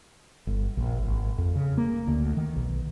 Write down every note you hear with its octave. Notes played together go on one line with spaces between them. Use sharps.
G1
A#1
G#1
F2
C#3
A#3
D2
D#3
B1